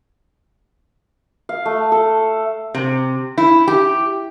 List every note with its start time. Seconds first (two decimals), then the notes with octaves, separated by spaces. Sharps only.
1.49 F5
1.65 A3
1.92 A4
2.75 C3
3.38 E4
3.68 G4